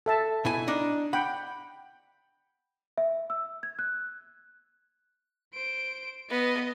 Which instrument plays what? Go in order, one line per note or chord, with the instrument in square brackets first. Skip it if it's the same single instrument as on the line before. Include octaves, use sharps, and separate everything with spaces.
[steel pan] A4 E5 A5
[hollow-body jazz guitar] B2 E4 G#5
D4 D#4
[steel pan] F#5 G5 [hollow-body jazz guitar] B5
[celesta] E5
E6
G#6
F#6
[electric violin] C5 D7
[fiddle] B3 [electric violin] D#5